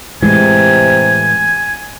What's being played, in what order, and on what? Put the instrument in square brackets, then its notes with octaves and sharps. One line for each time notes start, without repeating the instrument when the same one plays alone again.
[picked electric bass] A2 E3 [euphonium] C3 [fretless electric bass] G#3 [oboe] G#5